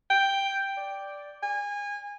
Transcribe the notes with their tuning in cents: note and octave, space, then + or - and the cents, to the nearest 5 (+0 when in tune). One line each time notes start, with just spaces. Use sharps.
G5 +5
D5 -5
G#5 -25